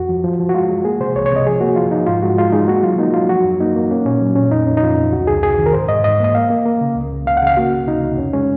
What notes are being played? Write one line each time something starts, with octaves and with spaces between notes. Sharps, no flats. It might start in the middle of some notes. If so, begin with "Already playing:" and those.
Already playing: F2 F#4
F3
F3
F3
F#4
G#3 F4
G#3
A#3 G#4
C3 C5
C2 C#5
C#5
C3 D#5
F3 G#4
A#3 F#4
F3 F4
F3 D#4
G#2 F4
G#3 F#4
G#3 F4
G#3 D#4
A#3 F#4
F#3 F4
A#3 D#4
F#3 F4
F3 F#4
F#2
A#3 D#4
A#3
A#3 C#4
A#2 C#4
F#3
A#2 C#4
F2 D#4
F2 C#4
D#4
F2 F4
F2
C#2 F#4
C#2 G#4
C3 G#4
D#3
A#4
G#2 C5
G#2 D#5
G#2 D#5
A#3 D#5
A#3 F5
A#3
A#3
C#3
C#2
C#3
C#2 F5
F#5
C#3 F5
A#3 F#4
C#2
C3 D#4
C#2
F2 C#4
G#3 C#4